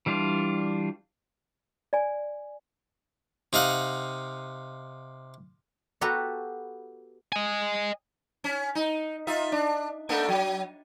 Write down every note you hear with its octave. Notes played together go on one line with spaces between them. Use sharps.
E3 G3 D4 F4
D5 G#5
C3 D#4 F5 F#5
B3 F#4 G4 A4 B4 A#5
D#5 G#5
C#4
D#4
D#4 F4 E5
D4
A3 A#3 D4
F#3